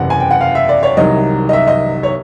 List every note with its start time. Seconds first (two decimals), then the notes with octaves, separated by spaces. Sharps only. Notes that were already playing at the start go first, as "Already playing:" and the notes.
Already playing: F#1 E2 C3 F#5
0.10 G#5
0.20 G5
0.31 F#5
0.41 F5
0.55 E5
0.69 D5
0.83 C#5
0.97 C2 C3 D#3 F#3 D#5
1.49 D#5
1.53 E5
1.68 D#5
2.03 C#5